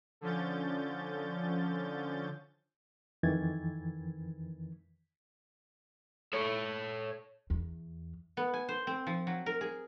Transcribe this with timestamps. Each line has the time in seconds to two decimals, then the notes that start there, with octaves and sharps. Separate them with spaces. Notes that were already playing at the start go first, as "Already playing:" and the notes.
0.21 D3 F3 C#4 G6 A6
3.23 F2 D#3 E3 G#6 A6
6.33 A4 C#5
7.50 E2
8.37 B3
8.54 G#5
8.69 C5
8.87 C4
9.07 F3
9.27 F#3
9.46 A#4
9.61 G#4